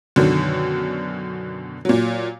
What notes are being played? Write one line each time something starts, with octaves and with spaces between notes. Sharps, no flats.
F#2 B2 D3 D#3
A#2 F#3